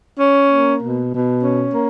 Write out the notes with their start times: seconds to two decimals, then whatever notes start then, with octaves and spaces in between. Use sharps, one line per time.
0.19 C#4
0.50 A#3
0.81 B2
1.13 B2
1.43 C#4
1.74 A#3